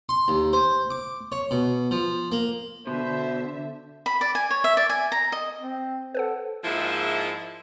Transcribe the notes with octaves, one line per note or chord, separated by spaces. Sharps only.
C6
D#2
C5
D6
C#5
B2
F3
A#3
B2 D3 C5 E5
B5
D5
G#5
C#5
E5
D5
G#5
A#5
D#5
C4
A4 B4 C5 F#5
G#2 F3 G#3 A#3 E4 E5